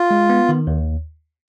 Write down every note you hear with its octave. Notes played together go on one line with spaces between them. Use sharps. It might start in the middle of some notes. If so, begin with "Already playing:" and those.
Already playing: F4
G#3
B3
D#3
D#2